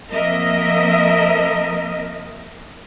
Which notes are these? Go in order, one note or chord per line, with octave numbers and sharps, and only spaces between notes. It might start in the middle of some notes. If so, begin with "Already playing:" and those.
F3 A#3 C4 A#4 D#5 E5